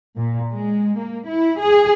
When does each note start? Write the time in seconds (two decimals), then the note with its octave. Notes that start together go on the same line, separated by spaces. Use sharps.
0.16 A#2
0.52 G#3
0.99 A#3
1.28 E4
1.61 G#4